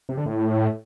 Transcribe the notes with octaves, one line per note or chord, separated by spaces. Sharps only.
C3
D3
A2